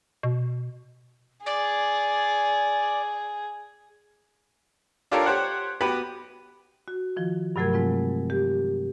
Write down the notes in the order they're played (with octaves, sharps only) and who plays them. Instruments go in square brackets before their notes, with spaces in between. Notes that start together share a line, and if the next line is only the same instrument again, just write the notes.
[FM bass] B2
[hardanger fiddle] G#4 [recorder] D5
[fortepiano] D4 F4 G4 A4 A#4 C#5
G4 C5 C#5 F#5
B3 F#4 G4 B4 B5
[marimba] F#4
D#3 F3 F4
G2 C3 F#3 A3 A#4 G#6
F3 G#3 C4 F4
G4